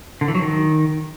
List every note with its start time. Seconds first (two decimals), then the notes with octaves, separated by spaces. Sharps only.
0.21 D3
0.28 E3
0.35 F#3
0.41 D#3